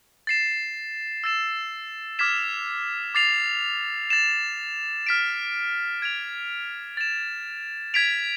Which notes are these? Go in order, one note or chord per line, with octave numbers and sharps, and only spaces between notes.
A6 C7 E7
E6 A6 E7
D6 F6 G#6 B6 E7
D6 A6 C7 F7
A6 E7
F6 B6 D7
G#6 D7 F7
A6 E7
G#6 B6 D7 F7